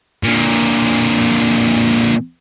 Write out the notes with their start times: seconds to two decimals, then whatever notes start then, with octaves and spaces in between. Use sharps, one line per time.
0.23 A#2 D3